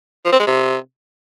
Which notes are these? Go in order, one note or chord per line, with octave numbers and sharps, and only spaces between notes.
F3
C4
G#3
C3